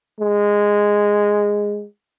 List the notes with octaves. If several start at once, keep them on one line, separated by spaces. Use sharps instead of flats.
G#3